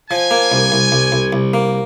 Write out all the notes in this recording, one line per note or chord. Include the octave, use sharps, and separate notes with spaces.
F3 G#5
A#3
C2
C2
C2
C2
C2
A#3